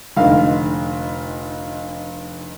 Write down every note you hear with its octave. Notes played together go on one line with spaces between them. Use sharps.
F1 D3 D#4 F5